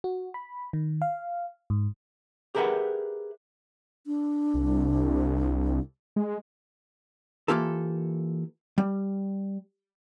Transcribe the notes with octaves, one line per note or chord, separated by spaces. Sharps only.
F#4
B5
D#3
F5
G#2
G4 G#4 A#4 B4 E5 F#5
D4
C2
G#3
E3 F3 A#3 F4 G4 A4
G3